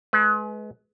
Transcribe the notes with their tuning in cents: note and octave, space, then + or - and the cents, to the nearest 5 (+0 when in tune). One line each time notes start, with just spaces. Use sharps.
G#3 +35 B4 +0